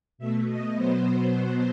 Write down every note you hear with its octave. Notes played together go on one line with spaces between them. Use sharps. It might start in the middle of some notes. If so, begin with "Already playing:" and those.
B2 A3 E5
D#5
B2 F#3 B3 C5